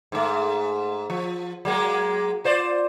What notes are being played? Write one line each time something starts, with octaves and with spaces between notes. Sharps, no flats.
G#2 A3
F3
F#3 G#3 A#3
F4 C5 D5